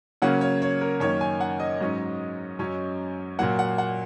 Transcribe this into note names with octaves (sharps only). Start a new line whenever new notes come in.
C#3 F#3 A#3 C#4 F#5
C#5
C#5
A#4
F#2 D#3 A#3 C#4 C#5
G#5
F#5
D#5
G#2 F#3 C#4
F#2 F#3 C#4
A#2 F#3 A#3 F#5
F#5
F#5